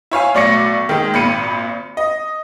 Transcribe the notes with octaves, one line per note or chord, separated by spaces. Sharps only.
E4 C#5 F5 G#5
B1 A2 D5 C#6 A#6 C#7
D#3 G#3 A#3
G#1 A#2 B5 C#7 D#7
D#5